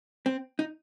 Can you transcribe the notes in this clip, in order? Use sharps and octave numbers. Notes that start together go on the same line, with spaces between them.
C4
D#4